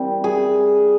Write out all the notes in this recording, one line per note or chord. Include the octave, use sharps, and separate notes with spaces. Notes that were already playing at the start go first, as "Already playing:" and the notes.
Already playing: E3 G3 C4 A#4
G#4